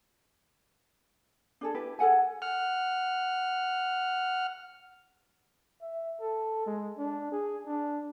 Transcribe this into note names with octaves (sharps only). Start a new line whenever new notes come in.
D4 G#4 A4
E4 G4 B4
G#4 A4 F#5 G#5
F#5 F6
E5
A4
G#3
D4
G#4
D4